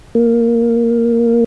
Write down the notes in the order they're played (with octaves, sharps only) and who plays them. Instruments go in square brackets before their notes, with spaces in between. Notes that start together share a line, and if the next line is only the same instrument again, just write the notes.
[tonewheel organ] A#3